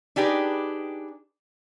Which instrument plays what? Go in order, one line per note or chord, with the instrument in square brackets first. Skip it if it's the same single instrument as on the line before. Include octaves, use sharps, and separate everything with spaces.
[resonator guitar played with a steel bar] D4 D#4 G4 G#4 B4